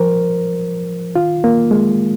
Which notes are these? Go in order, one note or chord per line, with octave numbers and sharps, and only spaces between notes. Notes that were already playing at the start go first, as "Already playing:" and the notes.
Already playing: F3 A#4 C5
D#3 F4
A#3
G#3